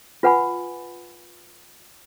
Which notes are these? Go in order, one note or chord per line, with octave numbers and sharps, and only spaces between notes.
F4 B4 F#5 G#5 B5